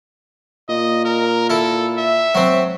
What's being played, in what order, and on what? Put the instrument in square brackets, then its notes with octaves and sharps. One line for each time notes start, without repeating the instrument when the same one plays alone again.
[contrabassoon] A#2 [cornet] D#5
[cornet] A#4
[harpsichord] E4 [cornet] A4
[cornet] E5
[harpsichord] F#3 C4